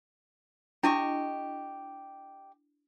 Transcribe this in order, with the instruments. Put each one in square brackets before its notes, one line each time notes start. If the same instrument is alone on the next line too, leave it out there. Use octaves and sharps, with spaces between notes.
[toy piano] D4 E4 [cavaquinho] G4 D#5 C#6